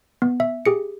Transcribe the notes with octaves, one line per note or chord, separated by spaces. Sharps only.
B3
E5
G4 G#4 C#7